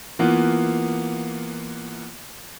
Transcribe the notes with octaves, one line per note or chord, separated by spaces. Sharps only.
E3 A#3 B3 F4